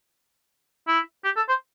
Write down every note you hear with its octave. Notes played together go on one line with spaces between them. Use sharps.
E4
G4
A4
C5